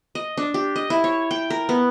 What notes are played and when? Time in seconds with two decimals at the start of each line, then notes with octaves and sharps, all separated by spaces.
0.15 D#5
0.37 D4
0.54 G4
0.76 D#5
0.90 E4
1.04 C#5
1.31 G5
1.50 A#4
1.69 B3